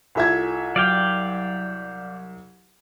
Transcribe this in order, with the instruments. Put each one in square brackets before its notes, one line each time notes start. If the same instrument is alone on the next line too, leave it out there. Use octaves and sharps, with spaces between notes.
[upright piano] C2 E5 G#6 [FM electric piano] F4 A4 G#5
[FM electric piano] F#3 [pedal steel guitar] D5 F5 G5